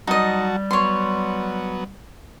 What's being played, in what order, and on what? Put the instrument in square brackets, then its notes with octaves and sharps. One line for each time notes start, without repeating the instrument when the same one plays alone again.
[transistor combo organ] F#3 F#4 A5 [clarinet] G3 [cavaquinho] D#4 D#5
[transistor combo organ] F#3 B3 [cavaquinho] C#5 C6